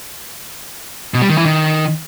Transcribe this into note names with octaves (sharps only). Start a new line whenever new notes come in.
B2
G3
D#3
E3
D#3